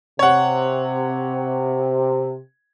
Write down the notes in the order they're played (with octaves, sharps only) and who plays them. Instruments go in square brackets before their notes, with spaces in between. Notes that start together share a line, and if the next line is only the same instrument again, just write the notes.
[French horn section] C3 [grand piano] C#5 F#5